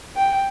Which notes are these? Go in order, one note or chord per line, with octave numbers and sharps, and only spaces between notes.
G5